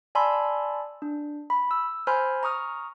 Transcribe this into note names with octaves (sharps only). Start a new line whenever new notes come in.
D5 G#5 A5 B5 C6 E6
D4
B5
E6
C5 G#5 B5 C6 F6
A#5 C#6 D#6 F6